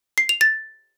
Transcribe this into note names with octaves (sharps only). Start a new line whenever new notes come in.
C7
F7
A6